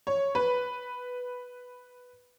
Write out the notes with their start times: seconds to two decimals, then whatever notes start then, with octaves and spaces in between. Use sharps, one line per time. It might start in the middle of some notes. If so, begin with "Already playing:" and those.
0.07 C#5
0.35 B4